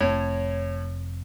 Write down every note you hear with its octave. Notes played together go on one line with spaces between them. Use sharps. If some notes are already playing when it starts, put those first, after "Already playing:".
F1 A2 C4 C#5